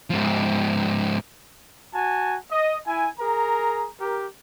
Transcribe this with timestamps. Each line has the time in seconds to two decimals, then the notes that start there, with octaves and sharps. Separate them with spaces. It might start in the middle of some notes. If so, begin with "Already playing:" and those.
0.10 G#2 F3
1.94 F#4 G#5 A5
2.51 D#5
2.86 E4 G#5
3.19 G#4 A#4 A#5
4.00 G4 A#4